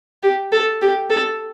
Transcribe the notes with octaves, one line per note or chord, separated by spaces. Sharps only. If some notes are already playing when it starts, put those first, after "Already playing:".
G4
A4
G4
A4